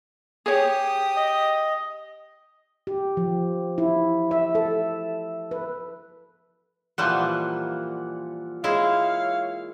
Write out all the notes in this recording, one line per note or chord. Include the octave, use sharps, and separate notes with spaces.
G4 G#4 C#5 D#6
D#5
G4
F3
E4
E5
A4
B4
A#2 E3 F3 G3 F#5
G#3 E4 C#5 F5